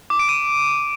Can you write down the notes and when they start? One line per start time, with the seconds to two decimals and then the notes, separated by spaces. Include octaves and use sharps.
0.10 D6
0.19 D7
0.29 D#7